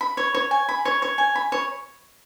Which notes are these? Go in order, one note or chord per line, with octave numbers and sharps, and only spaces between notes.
B5
C#5
C#5
G#5
B5
C#5
C#5
G#5
B5
C#5